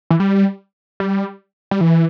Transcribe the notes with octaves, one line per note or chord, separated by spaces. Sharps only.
E3
G3
G3
G3
E3